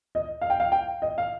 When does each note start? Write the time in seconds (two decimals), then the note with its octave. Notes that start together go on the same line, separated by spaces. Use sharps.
0.15 D#5
0.41 F5
0.50 G5
0.60 F5
0.72 G5
1.02 D#5
1.18 F5